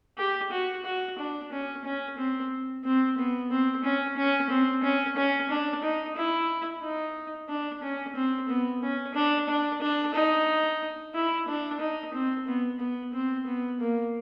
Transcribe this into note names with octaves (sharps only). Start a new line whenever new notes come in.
G4
F#4
F#4
D4
C#4
C#4
C4
C4
B3
C4
C#4
C#4
C4
C#4
C#4
D4
D#4
E4
D#4
D4
C#4
C4
B3
C#4
D4
D4
D4
D#4
E4
D4
D#4
C4
B3
B3
C4
B3
A#3